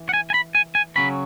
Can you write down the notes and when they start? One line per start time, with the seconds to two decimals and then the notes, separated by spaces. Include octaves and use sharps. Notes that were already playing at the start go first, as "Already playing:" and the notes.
Already playing: E3
0.09 F#5
0.14 G#5
0.30 G#5
0.34 B5
0.55 G#5
0.75 G#5
0.96 C#3 F#3 C#4 B5